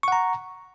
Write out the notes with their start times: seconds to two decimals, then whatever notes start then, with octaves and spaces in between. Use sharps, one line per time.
0.03 C#6
0.08 F#5
0.12 A#5